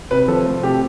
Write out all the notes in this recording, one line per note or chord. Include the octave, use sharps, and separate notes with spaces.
C3 B4
F3 A4
A3
C3 G4